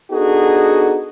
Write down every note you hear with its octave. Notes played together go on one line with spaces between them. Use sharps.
B3 D4 D#4 F#4 G#4 A4